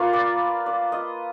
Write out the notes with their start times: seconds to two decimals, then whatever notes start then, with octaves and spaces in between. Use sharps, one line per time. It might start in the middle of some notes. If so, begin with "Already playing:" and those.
Already playing: A#3 F4 B4
0.13 D5
0.66 D5
0.92 D#5